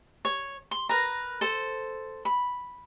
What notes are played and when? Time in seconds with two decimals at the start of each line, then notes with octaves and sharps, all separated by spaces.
0.25 C#5
0.71 C6
0.89 A#4 B4 A#5
1.41 A4 C5
2.25 B5